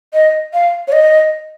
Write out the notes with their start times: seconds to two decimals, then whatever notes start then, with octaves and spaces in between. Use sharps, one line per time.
0.14 D#5
0.54 F5
0.88 C#5
0.92 D#5